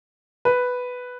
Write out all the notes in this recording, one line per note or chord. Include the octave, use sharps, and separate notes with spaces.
B4